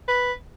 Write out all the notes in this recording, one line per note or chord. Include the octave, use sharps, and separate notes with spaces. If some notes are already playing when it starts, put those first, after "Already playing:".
B4